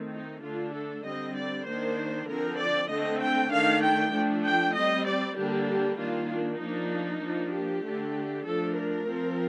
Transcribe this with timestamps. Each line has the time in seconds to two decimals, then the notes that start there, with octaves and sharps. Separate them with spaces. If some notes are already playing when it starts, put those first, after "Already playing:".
Already playing: D#3 A3 C4
0.12 D#4
0.43 D3 A3 D4 F4
0.74 A4
1.04 D3 G3 C4 D#5
1.36 D5
1.66 D#3 A#3 D4 C5
2.28 D3 F3 C4 A#4
2.59 D5
2.89 D3 A3 C4 D#5
3.20 G5
3.52 D#3 A3 D4 F5
3.82 G5
4.13 F3 A3 D4
4.45 G5
4.75 G3 C4 D#5
5.06 D5
5.37 D3 G3 A#3 D4 G4
5.68 G4
5.98 D#3 A#3 D4 F4
6.30 D4
6.60 F3 A#3 D4 D#4
7.22 F3 A#3 D4
7.53 G4
7.85 D3 A3 D4
8.46 F3 A3 D4 A4
8.77 A#4
9.08 F3 C4